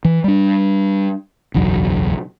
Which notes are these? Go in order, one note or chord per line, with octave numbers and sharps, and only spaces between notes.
E3
G3 D4
F#1 B1 E2 F#3